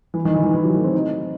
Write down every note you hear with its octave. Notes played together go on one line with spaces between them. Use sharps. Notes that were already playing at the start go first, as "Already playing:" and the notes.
E3
D#3
E3
D#3
E3
F#3
A3
C4
D#4